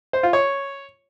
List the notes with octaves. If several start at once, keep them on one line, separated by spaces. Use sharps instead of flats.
C5
F4
C#5